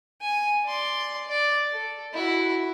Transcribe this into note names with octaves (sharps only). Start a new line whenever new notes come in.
G#5
D5 C6
D5
A4
E4 F#4